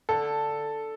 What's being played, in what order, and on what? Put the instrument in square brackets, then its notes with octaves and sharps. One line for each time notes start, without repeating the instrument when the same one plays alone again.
[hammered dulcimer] D3 [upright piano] A4